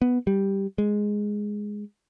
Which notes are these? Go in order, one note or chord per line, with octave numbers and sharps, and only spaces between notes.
B3
G3
G#3